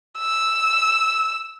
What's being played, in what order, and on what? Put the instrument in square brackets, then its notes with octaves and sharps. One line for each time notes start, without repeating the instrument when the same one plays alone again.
[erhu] E6